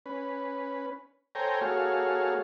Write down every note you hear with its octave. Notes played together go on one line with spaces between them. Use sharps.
C#4 B4
A4 C5 C#5 G5 G#5 A#5
A#3 F#4 G#4 A4 C#5 F5